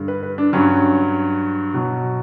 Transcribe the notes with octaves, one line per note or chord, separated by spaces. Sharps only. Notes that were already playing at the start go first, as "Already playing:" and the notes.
Already playing: G2 D3 G3
B4
B4
D4
G2 F#3 C#4
B2 F#3